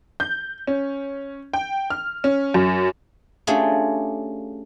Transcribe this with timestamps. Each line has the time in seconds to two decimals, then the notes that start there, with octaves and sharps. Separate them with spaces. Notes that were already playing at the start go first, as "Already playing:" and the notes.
0.20 G6
0.67 C#4
1.53 G5
1.90 F6
2.24 C#4
2.54 F#2
3.47 A3 C#4 D4 F4 G4 G#4